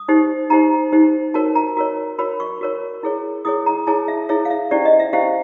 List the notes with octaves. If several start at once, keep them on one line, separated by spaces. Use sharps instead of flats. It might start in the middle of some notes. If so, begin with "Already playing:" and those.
Already playing: D#6
D#4 G4 C5
D#4 G4 C5 A#5
D#4 G4 C5
F#4 A#4 C#5 A5
A#5
F#4 A#4 C#5
F#4 A#4 C#5 B5
C#6
F#4 A#4 C#5
E4 G#4 C#5
E4 G#4 C#5 D#6
A#5
E4 G#4 C#5 A5
E5
E4 G#4 C#5 E5
F5
E5
C#4 E4 G4 C5 D5
D#5
E5
C#4 E4 G4 C5 F5